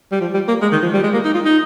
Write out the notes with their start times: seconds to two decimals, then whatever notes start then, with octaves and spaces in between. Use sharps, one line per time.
0.12 G3
0.21 F3
0.34 G3
0.48 A#3
0.62 G#3
0.72 D#3
0.82 F3
0.93 G3
1.03 G#3
1.13 A#3
1.24 D#4
1.34 F4
1.45 D#4